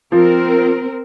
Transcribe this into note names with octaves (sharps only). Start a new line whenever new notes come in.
F3 C4 A#4